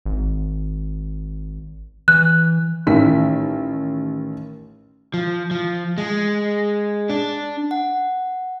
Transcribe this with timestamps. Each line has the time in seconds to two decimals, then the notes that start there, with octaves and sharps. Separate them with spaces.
0.06 G#1
2.08 E3 F#6
2.87 A1 D#3 B6
5.14 F3
5.51 F3
5.98 G#3
7.09 D4
7.71 F#5